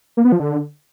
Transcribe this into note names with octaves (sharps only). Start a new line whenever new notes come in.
A#3
B3
F3
D3